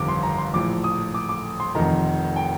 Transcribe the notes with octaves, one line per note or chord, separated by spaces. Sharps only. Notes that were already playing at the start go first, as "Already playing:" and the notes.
Already playing: G1 F2 C3 D#3 D6
C6
A#5
C6
A#1 A2 D6
D#6
D6
D6
C6
F1 F2 D#3 A#5
G5